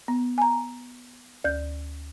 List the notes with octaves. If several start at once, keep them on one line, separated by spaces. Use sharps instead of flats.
B3
G#5 A#5
D2 G6